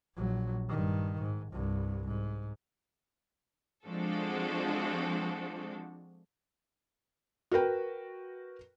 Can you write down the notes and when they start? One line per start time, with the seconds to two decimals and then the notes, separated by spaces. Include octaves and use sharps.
0.16 A#1 F#3
0.69 G2 D#3
1.21 G#2
1.53 C2 G2
2.08 G#2
3.87 F3 G#3 C4 D4 F#4 A4
7.51 F#4 A#4 B4 G5